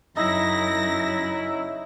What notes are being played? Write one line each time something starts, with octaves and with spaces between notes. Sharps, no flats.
F#2 C#3 F#3 D#4 E4 A#6